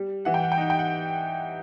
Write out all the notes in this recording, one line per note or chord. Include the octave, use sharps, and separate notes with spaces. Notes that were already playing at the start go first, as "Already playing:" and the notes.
Already playing: G3
E3 F#5
G5
F#5
G5
D#4 F#5
G5
F#5